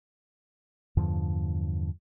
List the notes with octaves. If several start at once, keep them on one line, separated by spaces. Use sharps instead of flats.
E2 G2 D3 F3